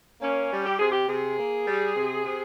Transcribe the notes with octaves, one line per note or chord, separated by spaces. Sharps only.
A#3 C#4
G3
G4
C3 G#4
G4
C3 G#4
A#3
G3
C3
C3